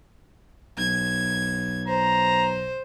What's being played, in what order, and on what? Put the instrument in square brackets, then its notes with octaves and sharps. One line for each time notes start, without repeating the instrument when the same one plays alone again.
[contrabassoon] B1 [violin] G#6
[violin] C5 [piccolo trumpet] A#5